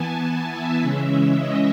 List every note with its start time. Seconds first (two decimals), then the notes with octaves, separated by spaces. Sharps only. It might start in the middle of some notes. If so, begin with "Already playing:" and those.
Already playing: E3 B3 G#5 A5
0.22 A5
0.52 E5
0.81 C#3 E3 G#3 C#4 E5
1.40 D#5